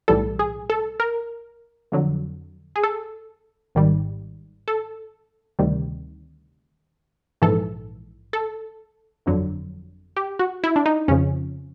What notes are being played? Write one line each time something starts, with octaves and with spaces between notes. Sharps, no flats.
B1 A2 E3 G3 A4
G#4
A4
A#4
F2 D3 F#3
G#4
A4
G#1 G#2 D#3 G3
A4
D2 C3 D#3 G3
A#1 G#2 E3 A4
A4
G1 F2 D3 F#3
G4
F#4
E4
D4
D#4
F2 C#3 F3 C#4